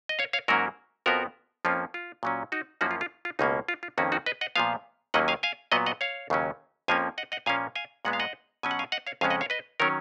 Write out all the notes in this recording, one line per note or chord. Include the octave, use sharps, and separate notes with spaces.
D#5
C#5 F5
C#5 F5
G#2 F#3 A#3 C#4 F#4 A#4
F2 F3 B3 F#4 A#4
F2 F3 A#3 C#4 F4
F4
A#2 F#3 C#4
D#4 F#4
F#2 F3 A#3 C#4 D#4 F#4
F4
F4
F4
C#2 B2 A#3 C#4 D#4
F4
F4
F2 D#3 A#3 C#4 D#4 F#4
D#4 F#4
B4 D#5
D#5 F#5
A#2 F3 B3 F5 G#5
D#2 D#3 F#3 A#3 C#4 D#5 F#5
F5 G#5
F5 G#5
A#2 F#3 B3 D#5 F#5
D#5 F#5
C#5 F5
D#2 C#3 F#3 C#4
F2 F3 A#3 C#4 F5 G#5
D#5 F#5
D#5 F#5
A#2 F3 A#3 C#4 F5 G#5
F5 G#5
A#2 G#3 B3 D#5 F#5
F5
D#5 F#5
B2 F#3 C#4 G#5
F#5
F5 G#5
D#5 F#5
C#5 F5
F2 C#3 G#3 C#4 F5 G#5
D#5 F#5
C#5 F5
B4 D#5
D#3 F#3 C#4 A#4 C#5